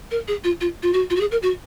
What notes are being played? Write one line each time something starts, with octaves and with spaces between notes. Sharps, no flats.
A#4
G#4
F4
F4
F4
F#4
F4
F#4
G#4
A#4
F#4